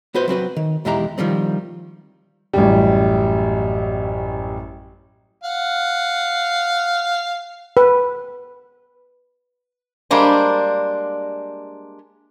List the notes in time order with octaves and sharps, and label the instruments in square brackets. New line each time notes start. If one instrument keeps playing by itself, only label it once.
[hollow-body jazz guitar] B3 F#4 B4 C5
F#3 C4 F#4 B4
D#3
B1 E2 G#3 E4 G4 A#5
D#3 F3 G3 C4
[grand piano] A1 F#2 G3
[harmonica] F5 F#5
[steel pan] B4
[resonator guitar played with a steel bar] G3 G#3 A#3 D4 C5